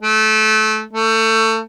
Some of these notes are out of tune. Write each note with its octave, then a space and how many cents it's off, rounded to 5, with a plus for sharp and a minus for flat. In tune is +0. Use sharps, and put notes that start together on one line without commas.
A3 -20
A3 +25